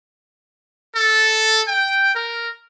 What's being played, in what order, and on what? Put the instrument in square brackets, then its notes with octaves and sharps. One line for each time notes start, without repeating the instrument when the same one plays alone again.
[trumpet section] A4
G5
A#4